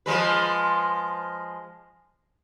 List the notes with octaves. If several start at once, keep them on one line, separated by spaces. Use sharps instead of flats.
F3 G#3 B4